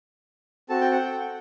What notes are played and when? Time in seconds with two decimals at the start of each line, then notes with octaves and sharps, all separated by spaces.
0.69 C4 F#4 A4 A5
0.81 G5
0.92 F#5
1.04 G5